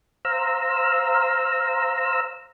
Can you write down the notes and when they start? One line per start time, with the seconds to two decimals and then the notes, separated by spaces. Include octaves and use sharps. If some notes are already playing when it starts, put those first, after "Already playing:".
0.25 C5 F5 A#5 E6